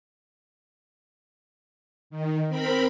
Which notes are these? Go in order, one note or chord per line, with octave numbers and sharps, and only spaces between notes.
D#3
C4 A#4 B5